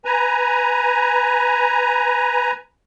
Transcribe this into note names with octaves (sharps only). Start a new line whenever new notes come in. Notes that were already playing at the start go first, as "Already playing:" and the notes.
B4 G#5 A#5